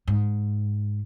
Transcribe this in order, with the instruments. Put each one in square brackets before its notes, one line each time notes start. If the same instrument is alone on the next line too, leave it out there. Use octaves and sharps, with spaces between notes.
[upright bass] G#2